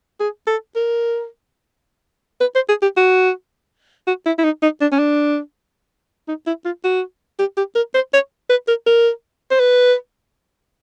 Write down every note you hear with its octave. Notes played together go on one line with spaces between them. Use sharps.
G#4
A4
A#4
B4
C5
G#4
G4
F#4
F#4
E4
E4
D#4
D#4
D4
C#4
D4
D#4
E4
F4
F#4
G4
G4
A#4
C5
C#5
B4
A#4
A#4
C5
B4